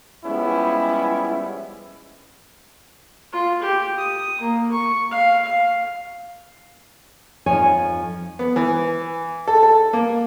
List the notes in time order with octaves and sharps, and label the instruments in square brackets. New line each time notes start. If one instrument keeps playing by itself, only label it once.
[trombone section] F3 G3 G#3 B3 C#4 E4
[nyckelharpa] F4
G4
D#6
A#3
C#6
F5
F5
[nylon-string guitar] F2 F3 D#4 C#5 G#5
[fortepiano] B3
E3
A4
A4
A#3